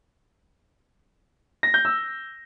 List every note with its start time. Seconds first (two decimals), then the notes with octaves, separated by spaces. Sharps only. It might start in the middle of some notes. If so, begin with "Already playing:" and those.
1.63 A#6
1.74 G6
1.85 E6